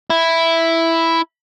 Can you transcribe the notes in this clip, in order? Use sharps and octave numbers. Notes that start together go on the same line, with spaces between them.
E4